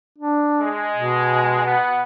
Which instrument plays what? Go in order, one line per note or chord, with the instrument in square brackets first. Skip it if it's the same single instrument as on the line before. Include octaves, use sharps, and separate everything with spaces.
[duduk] D4
[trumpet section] G#3
[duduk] B2
[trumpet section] B3